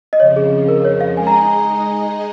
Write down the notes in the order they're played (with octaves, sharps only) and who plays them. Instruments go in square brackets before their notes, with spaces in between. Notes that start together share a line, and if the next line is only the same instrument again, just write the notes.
[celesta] D#5
[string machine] F2 C#3 F3 [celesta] C#5
[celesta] G#4
A#4
C#5
F5
[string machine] G#3 D#4 G#4 D#5 [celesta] G#5
[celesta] A#5
G#5